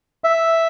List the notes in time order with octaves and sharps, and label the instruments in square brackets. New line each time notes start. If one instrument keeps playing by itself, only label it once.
[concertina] E5